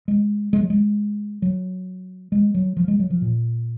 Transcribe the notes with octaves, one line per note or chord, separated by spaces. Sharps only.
G#3
G#3
F#3
G#3
F#3
G#3
F#3
F3
G#3
F#3
F3
A#2